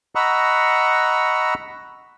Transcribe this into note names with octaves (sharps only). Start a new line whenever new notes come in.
D#5 F#5 A#5 B5 C#6 E6